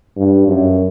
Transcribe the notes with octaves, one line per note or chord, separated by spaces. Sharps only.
G2
F#2